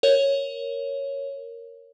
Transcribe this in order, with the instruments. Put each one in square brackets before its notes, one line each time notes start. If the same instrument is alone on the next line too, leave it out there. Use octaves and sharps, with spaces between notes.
[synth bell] A#4 C#5